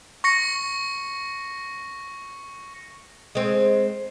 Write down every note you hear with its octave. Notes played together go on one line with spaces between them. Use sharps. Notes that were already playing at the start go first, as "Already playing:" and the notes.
C#6 A#6 C#7
G#3 C4